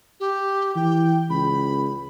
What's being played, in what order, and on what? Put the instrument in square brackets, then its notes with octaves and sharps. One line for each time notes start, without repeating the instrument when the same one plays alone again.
[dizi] G4
[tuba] E3 [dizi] G5
[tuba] C#2 [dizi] B5